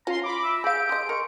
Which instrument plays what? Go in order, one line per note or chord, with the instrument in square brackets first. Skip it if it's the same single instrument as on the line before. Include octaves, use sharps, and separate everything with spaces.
[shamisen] C#4 [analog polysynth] F4 C6 [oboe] A#5
[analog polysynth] B5 D6
[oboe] E5 [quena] E6
[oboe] G4 [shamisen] G#4 F5 [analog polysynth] D7
[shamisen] G#4 D#5 [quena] C6
[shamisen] A#4 [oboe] C#6